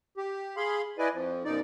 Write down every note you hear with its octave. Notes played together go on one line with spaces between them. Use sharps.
G4
G#4 F5 B5 C6
E4 B4 D5 D#5 G#5
F2 F3
F#2 B2 F3 D#4 D5